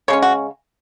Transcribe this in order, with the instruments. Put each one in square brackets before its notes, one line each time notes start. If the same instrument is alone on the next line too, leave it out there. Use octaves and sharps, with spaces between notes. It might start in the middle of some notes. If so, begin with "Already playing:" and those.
[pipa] C#3 G#3 C#4 C#5
F#4